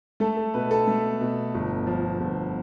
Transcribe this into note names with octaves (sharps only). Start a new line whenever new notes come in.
A3 A4
A4
B2 B4
A4
A3
B2
G1
F3
G1